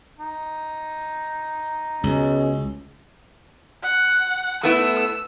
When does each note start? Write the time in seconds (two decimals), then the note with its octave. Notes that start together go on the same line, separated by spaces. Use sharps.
0.19 D#4
2.03 C#2 B2 G#3 C#4
3.83 F#5
4.63 A3 B3 E4 E6